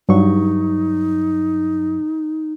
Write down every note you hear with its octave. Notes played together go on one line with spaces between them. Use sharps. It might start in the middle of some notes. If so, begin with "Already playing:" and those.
G2 F#3 D#4 C#6